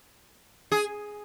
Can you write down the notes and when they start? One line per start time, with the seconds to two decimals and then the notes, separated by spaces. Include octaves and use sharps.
0.72 G#4